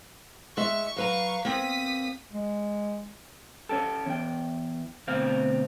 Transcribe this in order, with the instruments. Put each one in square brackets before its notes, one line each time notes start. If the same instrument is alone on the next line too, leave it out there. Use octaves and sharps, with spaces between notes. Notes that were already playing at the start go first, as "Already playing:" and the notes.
[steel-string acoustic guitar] G#3 E5 [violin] C#6
[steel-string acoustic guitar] F#3 B4 A#5 [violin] F5 C#6
[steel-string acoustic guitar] A#3 C4 [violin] D#6 B6
[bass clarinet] G#3
[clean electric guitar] C#4 D#4 G4 A4
E2 G5
D2 B2 C4 F5